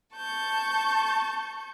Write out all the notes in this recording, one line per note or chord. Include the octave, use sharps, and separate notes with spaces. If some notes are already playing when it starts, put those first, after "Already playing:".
A5 C#6 G6